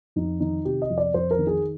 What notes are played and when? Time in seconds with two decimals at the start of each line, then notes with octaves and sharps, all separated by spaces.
0.16 F2 D#4
0.40 D#3 D#4
0.65 C3 G4
0.82 D#5
0.90 F2
0.98 D5
1.14 F2 C5
1.31 A#4
1.39 D#3
1.47 G#4